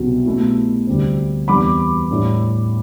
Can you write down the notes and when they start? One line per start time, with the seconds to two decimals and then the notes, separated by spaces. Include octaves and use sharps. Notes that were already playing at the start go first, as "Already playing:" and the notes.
Already playing: C2 B2 F#3
0.25 B2 A3 E4
0.87 D2 C3 G3 C4
1.48 E2 C3 G3 D4 B5 D6
2.10 A2 G3 D4